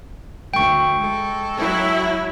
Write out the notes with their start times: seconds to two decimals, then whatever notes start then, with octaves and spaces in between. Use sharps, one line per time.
0.54 D2 G5 C#6
0.99 G#3 A4
1.58 F#3 E4